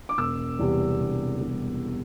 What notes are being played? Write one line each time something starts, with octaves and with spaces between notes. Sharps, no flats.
D6
E1 E6
E2 C3 G3
E1
E2 C3 G3